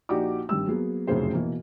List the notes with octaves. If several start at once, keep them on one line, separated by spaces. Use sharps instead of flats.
A#1 D#4 F#4 G4 D5 D6
G#1 G2 G3 E6
F#3 A#3 B3 G#4
F1 F#2 A2 C#3 G#4 C5
B2 E3 A#3